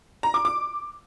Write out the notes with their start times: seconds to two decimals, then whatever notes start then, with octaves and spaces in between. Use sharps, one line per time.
0.23 A#5
0.34 D6
0.45 D6